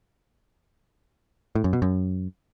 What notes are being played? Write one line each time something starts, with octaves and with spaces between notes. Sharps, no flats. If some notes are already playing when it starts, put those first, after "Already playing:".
A2
F#2
B2
F#2